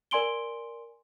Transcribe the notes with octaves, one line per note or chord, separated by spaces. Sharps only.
A#4 D5 G#5 C6 D7 G7